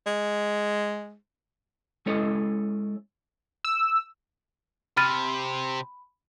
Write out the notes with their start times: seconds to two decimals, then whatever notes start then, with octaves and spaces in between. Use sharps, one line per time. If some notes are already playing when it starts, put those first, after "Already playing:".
0.07 G#3
2.06 G#3 C#4 E4 A4 C#5 D#5
3.65 E6
4.97 C3 B5 F6 A6 D#7